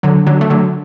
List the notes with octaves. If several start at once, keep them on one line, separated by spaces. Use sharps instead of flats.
D3 F#3
D3 F#3
A3
D3 F#3